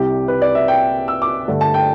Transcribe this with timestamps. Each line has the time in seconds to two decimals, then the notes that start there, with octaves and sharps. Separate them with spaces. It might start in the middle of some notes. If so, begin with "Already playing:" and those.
Already playing: C2 C3 G3 G4
0.28 B4
0.42 D5
0.55 E5
0.68 G5
1.08 E6
1.22 D6
1.48 G2 D3 A3
1.61 A5
1.74 G5